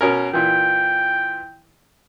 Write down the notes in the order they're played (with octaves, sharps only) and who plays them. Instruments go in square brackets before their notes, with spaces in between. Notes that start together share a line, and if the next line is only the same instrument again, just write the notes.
[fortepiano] B2 C#4 A#4
[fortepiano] A#2 E3 [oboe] G5